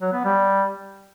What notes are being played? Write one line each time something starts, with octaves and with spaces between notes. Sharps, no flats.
F#3
B3
G3